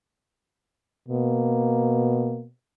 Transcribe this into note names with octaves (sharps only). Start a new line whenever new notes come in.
B2 A#3